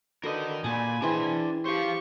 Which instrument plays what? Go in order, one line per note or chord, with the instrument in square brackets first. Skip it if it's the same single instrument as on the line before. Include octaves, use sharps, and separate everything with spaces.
[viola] D3 B4 [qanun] F#4 [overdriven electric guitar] A#4 D#5
[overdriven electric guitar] A#2 [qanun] F#5 A5 [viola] G#5 B5
[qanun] E3 C4 G#4 [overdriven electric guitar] D4 C6
[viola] G4 C#6 [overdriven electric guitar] C5 F5